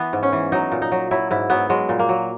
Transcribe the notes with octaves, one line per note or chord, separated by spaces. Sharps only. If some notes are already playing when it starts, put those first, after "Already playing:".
Already playing: E3 B3
G#2
C#4
E3
F#3 D#4
A#2
D#4
F#3
F#3 E4
G#2 E4
F#3 B3
F#3 G#3
A#2
A#3
F#3